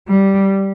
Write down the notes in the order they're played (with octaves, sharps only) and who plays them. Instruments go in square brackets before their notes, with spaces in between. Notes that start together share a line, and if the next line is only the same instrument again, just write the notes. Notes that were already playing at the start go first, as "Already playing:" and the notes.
[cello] G3